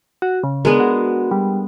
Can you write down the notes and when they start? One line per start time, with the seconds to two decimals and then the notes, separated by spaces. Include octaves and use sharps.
0.22 F#4
0.43 C#3
0.65 G#3 B3 D4 G#4 A#4
0.80 F#4
1.31 G3